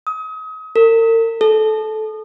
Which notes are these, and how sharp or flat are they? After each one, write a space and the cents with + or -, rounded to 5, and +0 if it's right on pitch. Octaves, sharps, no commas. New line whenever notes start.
D#6 +35
A#4 -45
A4 -20